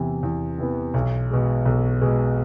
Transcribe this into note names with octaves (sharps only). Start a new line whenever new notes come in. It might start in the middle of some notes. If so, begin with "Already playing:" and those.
Already playing: E2 C3 E3 B3
E2
C3 E3 B3
B1
B2 G#3
B1
B2 G#3